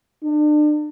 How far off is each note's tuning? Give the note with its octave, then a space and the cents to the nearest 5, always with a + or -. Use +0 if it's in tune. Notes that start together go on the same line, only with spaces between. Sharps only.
D4 +35